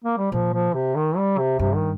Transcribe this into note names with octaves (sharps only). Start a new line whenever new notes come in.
A#3
G3
A#2 F3
F3
C3
D#3
G3
C3
G2 C3
D#3